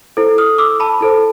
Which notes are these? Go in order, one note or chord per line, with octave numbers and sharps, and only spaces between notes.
E4 A4 C5
D#6 F6
D6 E6
A5 B5
E4 A4 C5